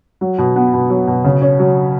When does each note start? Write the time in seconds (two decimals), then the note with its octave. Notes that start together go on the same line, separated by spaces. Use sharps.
0.21 F#3
0.38 B2
0.56 B3
0.73 B2
0.90 F#3
1.07 B2
1.24 C#3
1.41 C#4
1.59 F#3